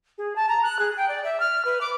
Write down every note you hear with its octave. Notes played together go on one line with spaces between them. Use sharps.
G#4
A5
A#5
F#6
G#4
G5
D5
E5
F6
B4
D6